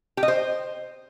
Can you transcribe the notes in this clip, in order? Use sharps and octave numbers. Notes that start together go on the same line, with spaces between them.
G4
D#5
C5